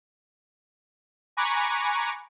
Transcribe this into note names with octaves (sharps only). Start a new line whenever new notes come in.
G#5 A#5 B5 C#6 D6 F#6